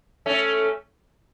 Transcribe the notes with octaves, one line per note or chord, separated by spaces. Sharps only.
A3 C#4